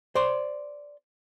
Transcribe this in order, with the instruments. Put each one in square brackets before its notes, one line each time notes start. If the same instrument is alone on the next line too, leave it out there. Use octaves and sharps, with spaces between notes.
[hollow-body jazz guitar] C5 D5 C6